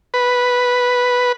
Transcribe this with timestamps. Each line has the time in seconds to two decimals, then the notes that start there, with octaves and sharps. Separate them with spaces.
0.14 B4